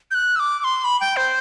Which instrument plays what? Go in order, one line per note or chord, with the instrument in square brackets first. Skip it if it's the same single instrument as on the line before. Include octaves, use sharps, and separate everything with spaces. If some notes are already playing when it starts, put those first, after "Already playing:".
[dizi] G6
F#6
E6
D6
D6
C6
B5
G5
C5